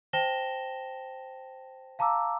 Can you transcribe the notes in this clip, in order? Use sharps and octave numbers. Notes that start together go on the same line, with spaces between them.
C5 G5 A5 A#6 E7 G7
F5 A5 A#5 D6 E6